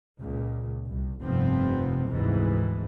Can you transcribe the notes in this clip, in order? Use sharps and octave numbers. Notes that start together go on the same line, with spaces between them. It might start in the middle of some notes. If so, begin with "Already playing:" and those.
C#2 A#2
C2
F1 G2 C3 F3 B3 C4
F1 D2 G#2 C3 E3